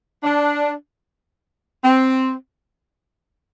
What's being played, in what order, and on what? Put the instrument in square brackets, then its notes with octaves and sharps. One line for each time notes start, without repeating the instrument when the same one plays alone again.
[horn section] D4
C4